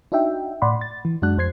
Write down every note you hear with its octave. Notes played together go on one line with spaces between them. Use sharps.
D4 D#4 F#4 E5 G5
A2 D5 F#5 B5 C6
A6
E3
F#2 G#3 D4 F#4 F#6
F2 C5 G#6 C7